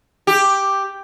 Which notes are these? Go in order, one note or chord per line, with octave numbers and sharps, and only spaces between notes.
G4